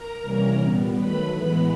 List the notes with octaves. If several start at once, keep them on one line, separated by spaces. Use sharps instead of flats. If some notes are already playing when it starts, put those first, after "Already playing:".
Already playing: A#4 A#5
C3 E3 G3 A#3 C#4
A#2 G3 B3
D#3 F#3 A3 B4 B5
A2 E3 G#3 B3